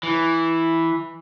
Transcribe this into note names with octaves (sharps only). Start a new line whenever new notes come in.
E3